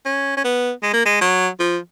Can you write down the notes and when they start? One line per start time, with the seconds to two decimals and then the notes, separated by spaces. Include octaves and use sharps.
0.06 C#4
0.37 C#4
0.44 B3
0.83 G#3
0.93 A#3
1.05 G#3
1.21 F#3
1.59 F3